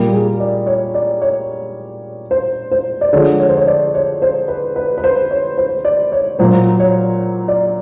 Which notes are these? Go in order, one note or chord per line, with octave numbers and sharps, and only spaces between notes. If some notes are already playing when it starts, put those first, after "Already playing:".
Already playing: A#2 G3 A#3 A#4
G#4
D5
C#5
D5
C#5
C5
C5
D5
D3 F3 G#3 C#5
C#5
C5
C#5
D5
C#5
C5
B4
B4
B4
C5
C#5
C5
D5
C#5
A#2 F#3 A#3 C5
C#5
D5